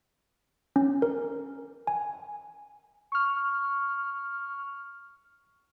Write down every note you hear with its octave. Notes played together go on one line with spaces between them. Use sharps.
C#4
A#4
G#5
C#6 F6